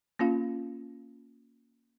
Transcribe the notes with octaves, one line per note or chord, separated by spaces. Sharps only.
A#3 C#4 F4 F5